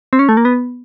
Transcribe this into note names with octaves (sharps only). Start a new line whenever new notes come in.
C4
C#4
A3
A#3
B3